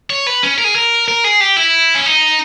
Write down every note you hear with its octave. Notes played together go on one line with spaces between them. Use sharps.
C#5
B4
C#4
A#4
G#4
A#4
A#4
G#4
G4
E4
C#4
D#4